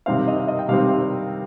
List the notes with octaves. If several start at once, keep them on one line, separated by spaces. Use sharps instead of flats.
C3 D#3 G3 C4 F5
D#5
F5
D#5
G5
C3 D#3 G3 C4 F5